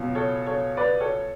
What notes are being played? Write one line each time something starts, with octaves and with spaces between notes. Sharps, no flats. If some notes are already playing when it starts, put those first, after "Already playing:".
Already playing: C#2 B2 F#3
A4 C#5
A4 C#5
B4 D5
A4 C#5